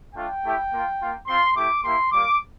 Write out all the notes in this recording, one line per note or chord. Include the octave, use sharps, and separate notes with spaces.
A3 D4 F4 G5
A3 E4 G4
A#3 F4
A#3 F4
C4 F4 C6
A3 E4 G4 D6
A#3 E4 G4 C6
G3 A#3 F4 D6